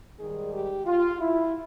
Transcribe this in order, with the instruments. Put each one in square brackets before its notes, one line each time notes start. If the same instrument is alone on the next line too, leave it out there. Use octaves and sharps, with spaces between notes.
[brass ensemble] G#2 D#3 G3 G#4
G4
F4
E4